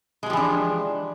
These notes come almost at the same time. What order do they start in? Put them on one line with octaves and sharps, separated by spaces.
G#3 G4 F3 E3 D4